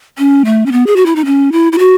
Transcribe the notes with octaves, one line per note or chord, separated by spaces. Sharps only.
C#4
A3
C#4
B3
G#4
F#4
E4
D#4
C#4
E4
E4
F#4